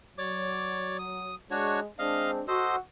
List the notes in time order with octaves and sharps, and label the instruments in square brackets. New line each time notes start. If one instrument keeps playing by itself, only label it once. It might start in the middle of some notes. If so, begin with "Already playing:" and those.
[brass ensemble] F#3 [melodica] C#5 D5 D6
[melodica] D#6
[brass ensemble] G#3 [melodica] D4 F#4 C#5
[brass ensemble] G#3 C4 D4 [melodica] D#5 F5
[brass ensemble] F#4 [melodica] A4 C5 D#5